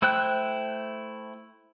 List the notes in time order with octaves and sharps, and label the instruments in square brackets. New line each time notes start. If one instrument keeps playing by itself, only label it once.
[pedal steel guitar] A3 E4 C5 G5 F#6